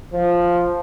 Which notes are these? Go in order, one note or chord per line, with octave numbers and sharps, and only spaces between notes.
F3